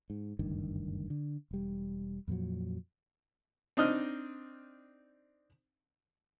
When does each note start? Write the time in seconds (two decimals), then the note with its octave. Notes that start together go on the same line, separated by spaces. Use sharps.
0.10 G#2
0.39 F#1 D2 G2 D#3
1.10 D3
1.51 E1 G3
2.28 F2 A#2 F3 F#3
3.77 C4 D4 D#4 D#5 F6